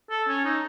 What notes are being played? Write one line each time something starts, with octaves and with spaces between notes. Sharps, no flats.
A4
C#4
D#4